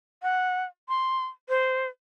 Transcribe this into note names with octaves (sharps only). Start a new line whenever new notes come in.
F#5
C6
C5